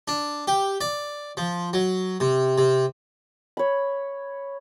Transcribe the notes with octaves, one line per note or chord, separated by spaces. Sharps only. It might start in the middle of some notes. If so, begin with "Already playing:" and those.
D4
G4
D5
F3
F#3
C3
C3
C#5 B5